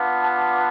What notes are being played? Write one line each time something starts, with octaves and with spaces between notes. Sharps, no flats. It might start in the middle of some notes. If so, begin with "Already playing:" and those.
Already playing: B3 D4 F4
A5